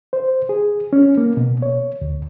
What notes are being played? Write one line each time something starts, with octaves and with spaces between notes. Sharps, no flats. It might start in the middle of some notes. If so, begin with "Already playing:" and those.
C5
G#4
C#4
A#3
B2
C#5
D2